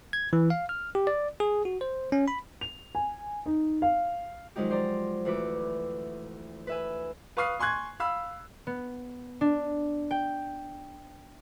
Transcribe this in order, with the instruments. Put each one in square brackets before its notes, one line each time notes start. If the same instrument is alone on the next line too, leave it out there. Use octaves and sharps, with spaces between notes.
[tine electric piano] G#6
E3
F5
F6
G4
D5
G#4
F#4
C5
C#4
B5
[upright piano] F7
G#5
D#4
F5
[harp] D#3 F3 F#3 G#3 D#4 G4
C5 D5 A#5
D2 E3 F#4 B4 D6
B4 E5 G#5
[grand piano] B4 F5 C#6 D#6 F6 C7
G#5 C6 C#6 F#6 G#6
F5 B5 E6
[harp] B3
D4
G5